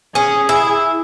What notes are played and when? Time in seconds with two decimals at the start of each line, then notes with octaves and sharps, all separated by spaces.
0.15 C#4 G#4 G#5 D#6
0.49 E4